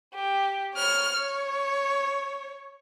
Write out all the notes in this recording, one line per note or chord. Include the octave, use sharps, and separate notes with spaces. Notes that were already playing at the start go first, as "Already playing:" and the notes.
G4
C#5 F6
C#5